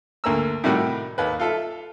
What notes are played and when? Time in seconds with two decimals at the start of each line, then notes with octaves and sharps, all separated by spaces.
0.24 D2 A#3 A#5 E6
0.64 A2 C3 D#3 G3 F#4
1.18 D#2 B4
1.39 F4 A4 E5